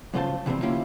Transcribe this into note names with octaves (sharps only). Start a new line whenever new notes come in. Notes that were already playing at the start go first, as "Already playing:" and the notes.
F#2 C#3 A#3 F4 C5 A5
C3 E3 G3 G#3 C4
D3 A#3 C#4 E4 F4 G4